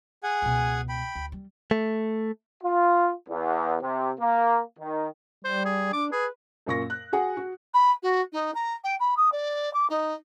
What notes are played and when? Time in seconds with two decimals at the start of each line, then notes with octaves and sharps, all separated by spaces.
0.23 G#4 F#5 G#5
0.42 C#2 B2
0.89 G5 B5
1.15 D2
1.32 G3
1.71 A3
2.64 F4
3.29 E2
3.82 C3
4.20 A#3
4.79 D#3
5.45 G3 C5
5.65 G#4
5.93 D4 D6
6.12 G#4 B4
6.67 F#2 A#2 C#6 A#6
6.90 F#6
7.13 F#4 G#4 F#5
7.37 F#4
7.74 B5
8.03 F#4
8.33 D#4
8.55 A#5
8.84 G5
9.00 B5
9.17 D#6
9.32 D5
9.74 D6
9.90 D#4